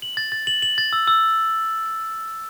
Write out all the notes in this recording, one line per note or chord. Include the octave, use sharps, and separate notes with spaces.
F#7
A6
A6
F#7
F#7
A6
E6
E6